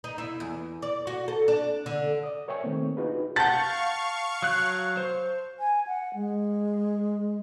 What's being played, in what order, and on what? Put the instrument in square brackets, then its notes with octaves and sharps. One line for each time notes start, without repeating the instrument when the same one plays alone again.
[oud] D#4
E4
E2
D5
F#4
A4
D4
D3
[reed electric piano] D5 D#6
A#4 C#5 E5 G5 G#5 C#6
D#3 A3 A#3 C4
D4 D#4 F4 F#4 G#4 B4
[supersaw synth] F5 C#6 [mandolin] F#5 G6 [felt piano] A5 A6
[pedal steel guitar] F#3 F#6
C5
[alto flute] G#5
F#5
G#3